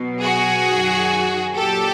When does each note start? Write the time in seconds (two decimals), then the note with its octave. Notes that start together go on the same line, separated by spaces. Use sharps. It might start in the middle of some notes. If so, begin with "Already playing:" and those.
Already playing: B2 F#3
0.21 F#4 G#4
0.66 F#2 D#3 F#3
1.55 A#2 F#3 G4 A4